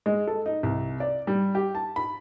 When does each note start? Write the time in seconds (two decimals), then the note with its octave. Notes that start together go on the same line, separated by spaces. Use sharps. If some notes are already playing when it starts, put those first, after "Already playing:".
0.06 G#3
0.27 A4
0.46 D#4
0.63 C2
1.00 D5
1.27 G3
1.55 G4
1.75 A5
1.96 B5